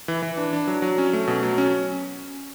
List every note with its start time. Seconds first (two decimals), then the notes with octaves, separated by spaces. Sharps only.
0.08 E3
0.22 E3
0.38 D4
0.53 D4
0.68 F#3
0.82 F#3
0.98 C#4
1.13 A3
1.28 B2
1.43 F#3
1.58 C#4